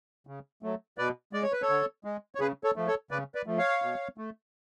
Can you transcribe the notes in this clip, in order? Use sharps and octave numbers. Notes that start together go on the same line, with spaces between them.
C#3
F#3 A3
B2 B4 D5
G#3 D5
C#5
B4
A4 C#5
D3
G#3
C#5
C#3 G#4 B4
A4 C#5
F3 A3
A4 C#5
C#3 B4 D5
B4 D5
F3 A3
C#5 F5
B2
A3